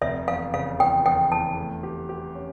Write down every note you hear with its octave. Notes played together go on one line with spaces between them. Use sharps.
F1 E5
E2 F5
C#3 F5
E2 G5
E2 G5
E2 A5
A3
G4
G4
C#4